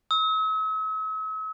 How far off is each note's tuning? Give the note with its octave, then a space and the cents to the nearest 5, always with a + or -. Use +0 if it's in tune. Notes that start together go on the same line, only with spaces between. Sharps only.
E6 -45